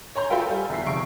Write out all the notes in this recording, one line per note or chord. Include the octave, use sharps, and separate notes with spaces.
C#5 G#5 A#5 C6 G6
F4 F#4 A4 B4 F5 G5
G3 G#5
E2 E5 C7
F1 C#6 D7